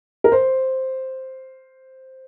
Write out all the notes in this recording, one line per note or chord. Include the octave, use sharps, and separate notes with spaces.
A#4
C5